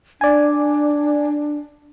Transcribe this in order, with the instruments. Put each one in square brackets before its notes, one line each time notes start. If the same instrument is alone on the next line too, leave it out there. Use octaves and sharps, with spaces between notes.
[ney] D4 [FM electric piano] D5 G#5